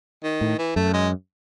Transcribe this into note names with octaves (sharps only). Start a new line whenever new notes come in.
D#3
A2
E3
F#2 A3
G#3